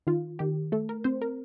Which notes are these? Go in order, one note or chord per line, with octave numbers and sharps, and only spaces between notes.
D#3 F4
D#3 G4
A3 A4
A#4
C4 C5
A#4